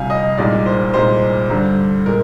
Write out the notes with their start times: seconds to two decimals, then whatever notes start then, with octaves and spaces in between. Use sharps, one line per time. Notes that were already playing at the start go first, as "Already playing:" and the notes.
Already playing: D2 C3 G3 F5 G#5
0.10 D#5
0.37 C2 A#2 G#3 D#4 D5
0.66 C5
0.94 C2 A#2 G#3 D#4 C5
1.50 G2 D3 G3 D4
2.06 A#2 G#3 A#4